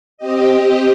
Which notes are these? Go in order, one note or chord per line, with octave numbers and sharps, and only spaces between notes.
C4 G4 D#5